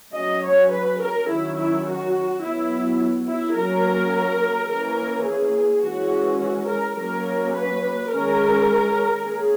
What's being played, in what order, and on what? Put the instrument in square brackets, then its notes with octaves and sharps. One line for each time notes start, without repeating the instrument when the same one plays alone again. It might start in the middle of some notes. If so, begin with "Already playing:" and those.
[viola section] F#3 C#4 D#5
C#5
B4
A#4
D#3 F#3 C#4 E4
E4
F#4
F#3 B3 E4
E4
F#3 A#3 C#4 A#4
E3 A#3 C#4 A#4
G#4
E3 G#3 C#4 F#4
F#4
A#4
F#3 A#3 C#4 A#4
B4
D#3 G#3 C#4 A#4
A#3 C#4 G#4